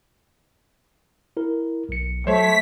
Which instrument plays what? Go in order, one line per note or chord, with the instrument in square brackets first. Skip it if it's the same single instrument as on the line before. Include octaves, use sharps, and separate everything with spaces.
[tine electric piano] E4 A#4
B1 C#7
[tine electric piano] F#3 [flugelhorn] A3 [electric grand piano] C5 C#5 [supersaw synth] B6